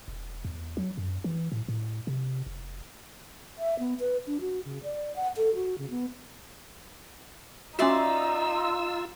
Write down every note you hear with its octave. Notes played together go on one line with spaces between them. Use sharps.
E1
E2
F#3
F#2
E3
A2
A2
C3
F1
E5
B3
B4
D4
F#4
C#3
D5
F#5
A4
F#4
C#3
B3
C#4 D#4 F4 F#4 D5 E5 C6 E6